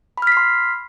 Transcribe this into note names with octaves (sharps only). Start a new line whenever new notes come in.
B5 C6 F6 B6 C7